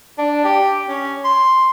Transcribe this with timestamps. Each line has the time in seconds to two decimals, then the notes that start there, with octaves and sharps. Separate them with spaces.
0.18 D4
0.44 G4
0.88 C#4
1.24 C6